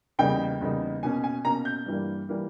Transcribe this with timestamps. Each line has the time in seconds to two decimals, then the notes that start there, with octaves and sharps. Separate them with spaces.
0.19 E2 C#3 G3 A#3 D#4 G5
0.61 E2 C#3 G3 A#3 D#4
1.03 B2 A#3 C#4 G#5
1.24 G#5
1.45 B2 A#3 C#4 A#5
1.65 G6
1.86 G2 E3 G3 A#3
2.29 E3 G3 A#3